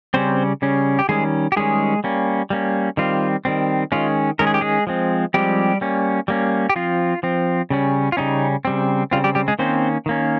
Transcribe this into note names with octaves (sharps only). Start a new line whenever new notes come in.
C#3 G3 C4 C#4 C5
C#3 G3 C#4
G4
D#3 G3 G#3 C#4 G#4
G4
D#3 G3 G#3 C#4 G#4
G3 A#3 C#4
G3 A#3 C#4
D#3 G3 C4 F4
D#3 G3 C4
D#3 G#3 C#4 F4
D#3 G#3 C#4 A#4
G#4
G4
G#3 G#4
F3 G#3 C4
F3 G3 G#3 C4 G4
G3 A#3 C#4
G3 A#3 C#4
G4
F3 C4 F4
F3 C4
C#3 G3 C#4
F4
C#3 G3 C#4 D#4
C#3 G3 C4
C#3 G3 C4 F4
G3 G4
G3 G4
G#3 G#4
D#3 A#3 C4 C#4 C5
D#3 A#3 C#4